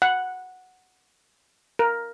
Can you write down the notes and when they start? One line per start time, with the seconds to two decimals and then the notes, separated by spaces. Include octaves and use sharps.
0.02 F#5
1.79 A#4